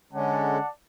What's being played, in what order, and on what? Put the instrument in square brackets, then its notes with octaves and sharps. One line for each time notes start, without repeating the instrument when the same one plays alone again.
[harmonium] D3 G#3 C#4 [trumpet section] D5 F#5 A5